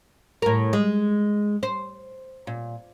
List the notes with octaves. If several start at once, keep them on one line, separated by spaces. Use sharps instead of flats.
A2 A#4
G#3
C5
A#2